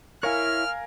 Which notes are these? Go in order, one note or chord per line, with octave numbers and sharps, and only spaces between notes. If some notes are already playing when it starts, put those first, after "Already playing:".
E4 A#4 C#5 F5 G#5 F6